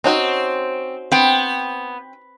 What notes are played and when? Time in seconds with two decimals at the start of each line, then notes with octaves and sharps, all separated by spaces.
0.04 C4 C#4 D#4 F#4
1.12 B3 C4 G5